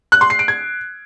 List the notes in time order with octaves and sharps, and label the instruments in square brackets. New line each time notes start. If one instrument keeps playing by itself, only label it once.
[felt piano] F#6
C6
C7
D7
G#6